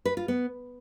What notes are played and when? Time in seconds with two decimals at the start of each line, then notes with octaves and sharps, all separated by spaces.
0.05 B4
0.17 F4
0.28 B3